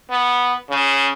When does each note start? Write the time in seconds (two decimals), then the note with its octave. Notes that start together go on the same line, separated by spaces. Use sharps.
0.10 B3
0.70 C#3